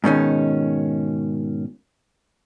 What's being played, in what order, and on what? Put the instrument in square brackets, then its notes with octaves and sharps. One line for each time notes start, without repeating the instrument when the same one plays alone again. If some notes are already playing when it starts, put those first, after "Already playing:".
[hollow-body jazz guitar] G#2 B2 D#3 C#4